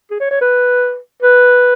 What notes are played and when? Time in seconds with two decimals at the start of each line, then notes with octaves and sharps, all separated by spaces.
0.11 G#4
0.20 C#5
0.31 C#5
0.41 B4
1.22 B4